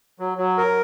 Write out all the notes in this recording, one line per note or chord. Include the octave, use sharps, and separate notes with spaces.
F#3
F#3
A#4